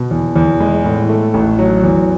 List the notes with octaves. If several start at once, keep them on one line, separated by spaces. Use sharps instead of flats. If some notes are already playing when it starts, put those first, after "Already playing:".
Already playing: B2
E2
E2
G#3
A2
A3
A1
F#3
E2